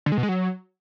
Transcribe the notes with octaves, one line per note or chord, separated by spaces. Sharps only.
D3
G#3
B2
G#3
F#3